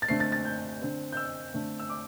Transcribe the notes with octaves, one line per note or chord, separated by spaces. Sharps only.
A6
D3 A3 C4 C7
A6
A6
G6
D3 C4
G6
E6
D3 A3 C4
E6
D6